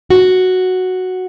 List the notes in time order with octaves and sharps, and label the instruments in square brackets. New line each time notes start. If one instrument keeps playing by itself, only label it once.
[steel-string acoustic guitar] F#4